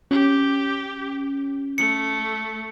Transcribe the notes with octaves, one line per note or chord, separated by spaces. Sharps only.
C#4 G4
A3 C#7